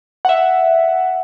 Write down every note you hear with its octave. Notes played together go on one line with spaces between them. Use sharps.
E5 F#5